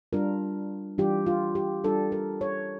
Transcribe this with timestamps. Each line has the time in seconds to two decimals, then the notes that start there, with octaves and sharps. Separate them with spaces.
0.13 G3 D4 F4 A#4
0.98 E3 G3 D4 F4 G4
1.26 F4
1.55 G4
1.84 G3 D4 F4 A4
2.12 A#4
2.41 C#5